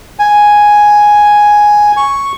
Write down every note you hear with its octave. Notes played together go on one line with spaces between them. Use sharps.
G#5
C#6